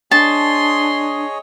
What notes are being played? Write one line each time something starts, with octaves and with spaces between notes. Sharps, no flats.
D4 G#4 C#5 D#5 A5 C6